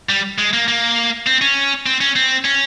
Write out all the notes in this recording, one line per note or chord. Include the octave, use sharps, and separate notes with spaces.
G3
G#3
A#3
A#3
C4
C#4
C4
C#4
C4
C#4